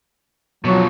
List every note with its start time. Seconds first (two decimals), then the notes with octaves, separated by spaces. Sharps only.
0.65 B2 F3 F#3